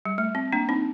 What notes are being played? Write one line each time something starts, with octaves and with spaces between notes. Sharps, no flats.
G3
A3
C4
A#3 D4
C4 D#4